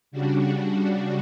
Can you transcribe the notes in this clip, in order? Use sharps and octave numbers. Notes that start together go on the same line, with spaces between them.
C#3 G3 D4 F#4